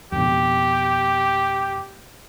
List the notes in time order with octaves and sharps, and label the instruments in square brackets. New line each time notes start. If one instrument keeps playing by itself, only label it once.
[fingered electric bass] F2 B2 [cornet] G4